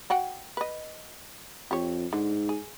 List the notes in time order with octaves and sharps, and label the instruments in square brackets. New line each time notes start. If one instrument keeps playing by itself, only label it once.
[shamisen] F#4 F#5 G5
B4 D#5
[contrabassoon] F2 [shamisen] G4 C#5
[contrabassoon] G#2 [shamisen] D3
[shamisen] G#4